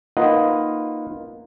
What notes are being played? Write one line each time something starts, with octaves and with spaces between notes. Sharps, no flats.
A#3 D#4 F4 B4 D#5 F#5